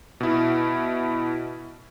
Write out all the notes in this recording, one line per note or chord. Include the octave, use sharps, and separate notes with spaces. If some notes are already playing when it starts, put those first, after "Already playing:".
B2 E4